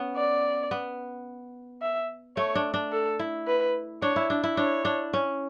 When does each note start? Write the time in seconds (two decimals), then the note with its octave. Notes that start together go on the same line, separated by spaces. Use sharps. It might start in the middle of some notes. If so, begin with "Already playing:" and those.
Already playing: B3 C#4
0.17 D5
0.71 B3
1.82 E5
2.37 A3 C#5
2.55 D4
2.74 D4
2.92 A4
3.19 E4
3.48 B4
4.02 D4 C#5
4.16 E4
4.30 D4
4.44 E4
4.57 D4 C#5
4.85 D4
5.13 C#4